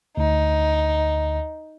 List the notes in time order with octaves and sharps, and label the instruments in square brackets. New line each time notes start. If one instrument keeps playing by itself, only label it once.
[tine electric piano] D2 [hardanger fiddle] D#4